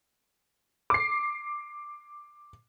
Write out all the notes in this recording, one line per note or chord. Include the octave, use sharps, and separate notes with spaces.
D6 C7